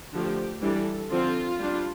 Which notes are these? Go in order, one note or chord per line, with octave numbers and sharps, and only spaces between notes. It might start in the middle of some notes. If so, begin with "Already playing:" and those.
D3 F3 A3 G4
E3 G3 D4 A4
D3 F3 C4 F4
G3 D4